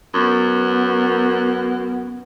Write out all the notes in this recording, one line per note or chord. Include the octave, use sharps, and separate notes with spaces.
F#2 B3